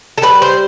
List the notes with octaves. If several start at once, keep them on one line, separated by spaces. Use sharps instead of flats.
A4
G3 B4
C5